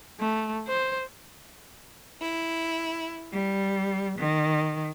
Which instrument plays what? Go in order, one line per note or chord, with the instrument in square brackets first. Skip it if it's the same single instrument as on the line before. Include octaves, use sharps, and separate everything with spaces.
[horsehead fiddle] A3
C5
[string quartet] E4
G3
D#3